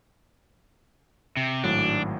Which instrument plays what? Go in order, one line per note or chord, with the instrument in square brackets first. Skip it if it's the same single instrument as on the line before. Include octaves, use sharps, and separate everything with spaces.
[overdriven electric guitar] C3
[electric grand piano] G#1 A2 F#3 [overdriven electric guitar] D4